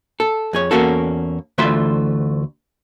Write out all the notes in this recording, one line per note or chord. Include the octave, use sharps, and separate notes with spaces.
A4
F2 G#4 C#5
E2 A#3 C#4 F#4 A4
D2 E3 A3 F4 C5 B5